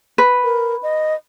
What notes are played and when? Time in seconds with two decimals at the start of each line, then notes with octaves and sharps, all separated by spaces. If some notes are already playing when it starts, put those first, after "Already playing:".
0.18 B4
0.44 A#4
0.83 D#5